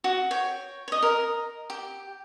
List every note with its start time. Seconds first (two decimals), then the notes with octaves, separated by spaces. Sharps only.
0.04 F#4
0.31 C#5 G5
0.88 C#5 D#5
1.02 A#4 D#5
1.70 G4